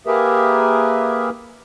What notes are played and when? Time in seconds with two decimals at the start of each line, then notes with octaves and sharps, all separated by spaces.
0.07 A#3 G4 G#4 A#4 B4 E5